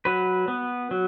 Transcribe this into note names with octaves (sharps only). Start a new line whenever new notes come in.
F#3 B4
B3
F#3